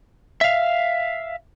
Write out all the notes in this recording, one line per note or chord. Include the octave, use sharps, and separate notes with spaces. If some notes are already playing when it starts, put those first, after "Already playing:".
E5 F5